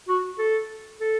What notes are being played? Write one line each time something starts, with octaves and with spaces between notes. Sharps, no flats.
F#4
A4
A4